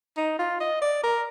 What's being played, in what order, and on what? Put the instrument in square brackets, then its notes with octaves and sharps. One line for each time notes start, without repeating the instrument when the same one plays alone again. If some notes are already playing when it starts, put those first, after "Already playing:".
[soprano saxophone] D#4
F4
D#5
D5
A#4